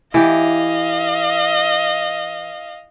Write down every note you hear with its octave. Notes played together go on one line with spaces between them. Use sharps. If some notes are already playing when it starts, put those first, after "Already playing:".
E3 G4 D#5 F5